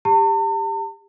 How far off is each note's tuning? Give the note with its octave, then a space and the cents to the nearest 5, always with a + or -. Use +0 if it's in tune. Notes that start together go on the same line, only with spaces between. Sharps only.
G4 +25 A5 +45